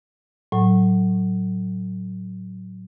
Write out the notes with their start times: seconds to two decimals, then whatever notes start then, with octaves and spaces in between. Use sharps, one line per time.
0.52 A2 F#3